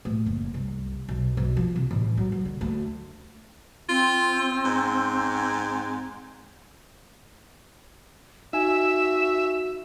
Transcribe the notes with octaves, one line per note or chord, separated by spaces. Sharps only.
A2
F#1
C2
B1
B1
F3
C3
A1
F#3
F#3
D3
D2
C4 F4
G#2
D#4 F#4 E5 G#5 E7